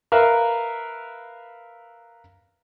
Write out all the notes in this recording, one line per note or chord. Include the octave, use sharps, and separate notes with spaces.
A#4 B4 E5 F5